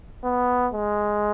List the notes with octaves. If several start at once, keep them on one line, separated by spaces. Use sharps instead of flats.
B3
G#3